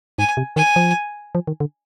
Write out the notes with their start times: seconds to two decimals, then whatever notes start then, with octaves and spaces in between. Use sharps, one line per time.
0.18 G#2 G#5
0.37 C3
0.56 D#3 G#5
0.76 F3
1.35 F3
1.47 D#3
1.60 D3